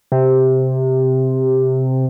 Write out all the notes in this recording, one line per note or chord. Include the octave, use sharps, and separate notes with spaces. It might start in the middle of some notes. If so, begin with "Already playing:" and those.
C3